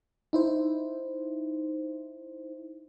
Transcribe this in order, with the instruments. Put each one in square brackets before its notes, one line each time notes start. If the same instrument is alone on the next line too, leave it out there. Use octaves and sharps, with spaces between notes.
[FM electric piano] D#4 E4 C5